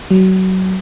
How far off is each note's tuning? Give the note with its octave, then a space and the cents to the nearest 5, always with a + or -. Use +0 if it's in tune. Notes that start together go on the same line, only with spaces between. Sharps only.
F#3 +25